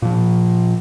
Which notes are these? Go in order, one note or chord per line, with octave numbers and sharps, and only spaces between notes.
A#2 F3